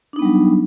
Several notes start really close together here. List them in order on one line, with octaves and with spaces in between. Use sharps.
D4 D#4 B3 G3 F#3